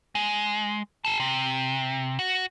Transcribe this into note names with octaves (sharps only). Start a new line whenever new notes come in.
G#3
G#4 A5
C3
F#4